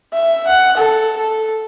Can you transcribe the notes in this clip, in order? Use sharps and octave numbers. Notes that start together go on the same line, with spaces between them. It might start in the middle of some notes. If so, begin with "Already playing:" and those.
E5
F#5
A4
A4